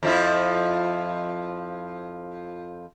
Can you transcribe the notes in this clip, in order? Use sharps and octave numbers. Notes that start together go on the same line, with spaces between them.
F2 F3 E4